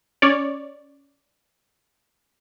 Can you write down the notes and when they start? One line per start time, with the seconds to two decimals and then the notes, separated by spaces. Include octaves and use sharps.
0.22 C#4 C#5 D5